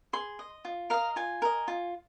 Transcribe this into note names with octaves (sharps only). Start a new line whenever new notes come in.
G#4 C6
D#5
F4
A#4 D#5 F5
F4 G#5
A#4 D#5
F4